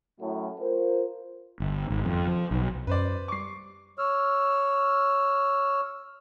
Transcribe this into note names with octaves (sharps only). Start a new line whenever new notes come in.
F#2 A2
F4 A#4 C5
G1
G#1
F2
F3
B1
F#2 B4 C5 D5
G3 C#6 D6 C7
C#5 E6 F6